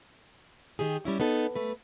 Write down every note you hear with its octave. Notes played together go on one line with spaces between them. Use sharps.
D#3 G4 G#4
G3 C#4 E4
B3 D#4 A4
A3 B4